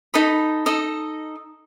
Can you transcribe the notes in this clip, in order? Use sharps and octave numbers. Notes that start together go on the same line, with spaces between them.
D#4 A4 D#5 B5
D#4 A4 D#5